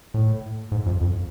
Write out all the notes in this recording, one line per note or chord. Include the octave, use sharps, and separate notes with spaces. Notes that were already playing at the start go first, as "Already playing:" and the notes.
A2
G#2
F2
F2